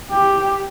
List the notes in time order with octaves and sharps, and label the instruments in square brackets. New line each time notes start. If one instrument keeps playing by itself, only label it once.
[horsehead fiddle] G4